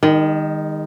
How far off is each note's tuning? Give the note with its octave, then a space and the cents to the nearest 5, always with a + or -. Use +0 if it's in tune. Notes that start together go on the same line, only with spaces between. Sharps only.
D#3 +0 G#3 -40